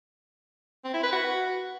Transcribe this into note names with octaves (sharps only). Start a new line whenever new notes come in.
C4
E4
B4
F#4